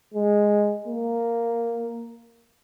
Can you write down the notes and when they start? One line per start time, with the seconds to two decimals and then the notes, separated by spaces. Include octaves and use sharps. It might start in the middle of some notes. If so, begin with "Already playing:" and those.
0.14 G#3
0.88 A#3